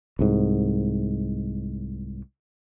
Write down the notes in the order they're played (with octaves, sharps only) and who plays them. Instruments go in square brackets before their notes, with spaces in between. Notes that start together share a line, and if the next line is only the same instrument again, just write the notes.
[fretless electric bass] C2 G#2